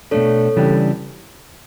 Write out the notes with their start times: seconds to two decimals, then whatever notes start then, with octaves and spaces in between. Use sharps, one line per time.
0.11 B2 A3 D4 A4 C#5
0.56 C#3 E3 G3 D4 G4